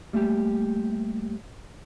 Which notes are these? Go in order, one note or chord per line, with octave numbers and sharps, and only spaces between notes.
G3 A3 A#3 G4